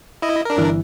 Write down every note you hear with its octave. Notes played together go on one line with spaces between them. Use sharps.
E4 D#5
D4 A#4
G1 E3